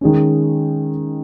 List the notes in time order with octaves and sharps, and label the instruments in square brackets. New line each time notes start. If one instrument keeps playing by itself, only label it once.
[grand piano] D#3 G#3 C#4